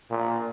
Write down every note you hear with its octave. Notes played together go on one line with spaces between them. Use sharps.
A#2